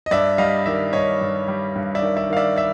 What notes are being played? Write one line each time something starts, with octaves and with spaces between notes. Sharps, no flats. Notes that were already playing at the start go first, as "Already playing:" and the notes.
D#5
G2 D5 E5
G3 D#5 F5
D#3 D5 E5
G2 C#5 D#5
G2
G3
G2
D5 E5
D#3
D5 E5
D#3 F5
D5 E5
D5 E5